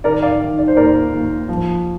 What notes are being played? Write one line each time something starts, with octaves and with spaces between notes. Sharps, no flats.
D#3 A#4 D5
D5 F5
D#3
D5
C5
D#2 A#4 D5
D#2
F3